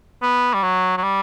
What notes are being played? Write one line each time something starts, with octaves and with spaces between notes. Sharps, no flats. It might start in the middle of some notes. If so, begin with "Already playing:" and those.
B3
G3
F#3
F#3
G3